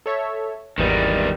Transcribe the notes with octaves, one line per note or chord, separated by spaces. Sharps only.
A4 C#5 E5
G#1 E2 D#3 G3 B4